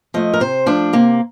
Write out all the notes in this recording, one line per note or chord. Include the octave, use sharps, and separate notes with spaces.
F3 A3 D#5
A#4
C3 C5
F3 A3 D4
C3 A#3